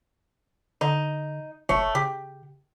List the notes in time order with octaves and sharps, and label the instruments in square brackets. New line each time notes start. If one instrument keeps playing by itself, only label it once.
[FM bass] D3 [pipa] D#4
[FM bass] F1 [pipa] A3 C#5
[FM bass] C#3 [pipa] G4